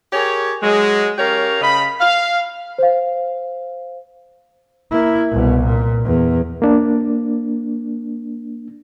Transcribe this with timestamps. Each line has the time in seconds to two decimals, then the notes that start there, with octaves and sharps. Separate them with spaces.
0.13 G4 G#4 A#4 C#5
0.62 F#3 G#3
1.18 C#4 G4 A#4 C#5 F5
1.61 C#3 D#5 B5
1.99 F5
2.78 C5 F5
4.91 A#3 E4
5.31 C2 B2
5.64 A#2
6.05 E2
6.62 A#3 D4